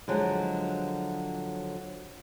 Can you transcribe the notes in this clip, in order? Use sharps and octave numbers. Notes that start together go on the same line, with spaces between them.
D3 F3 F#3 G#3